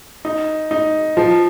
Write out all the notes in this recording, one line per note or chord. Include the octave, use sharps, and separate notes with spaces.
D#4
D#4
F3